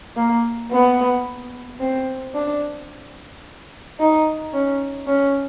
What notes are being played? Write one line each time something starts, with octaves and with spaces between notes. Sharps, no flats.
A#3
B3
C4
D4
D#4
C#4
C#4